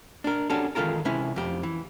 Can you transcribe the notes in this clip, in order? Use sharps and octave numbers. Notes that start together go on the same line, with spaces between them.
D4 A#4
C#4 D4 F#4 G4 A4
D#3 E3 G#3 F4 A4 A#4
C3 G#3 C#4 E4
F2 G4
E3